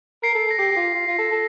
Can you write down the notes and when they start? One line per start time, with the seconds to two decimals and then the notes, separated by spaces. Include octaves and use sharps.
0.23 A#4 C7
0.35 A4
0.47 A4 A#6
0.59 G4 C7
0.72 G4
0.77 F4
0.95 F4
1.07 F4
1.19 A4
1.31 A4